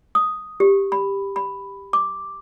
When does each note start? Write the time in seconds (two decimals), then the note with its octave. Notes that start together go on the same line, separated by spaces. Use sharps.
0.15 D#6
0.60 G4
0.92 B5
1.36 B5
1.93 D6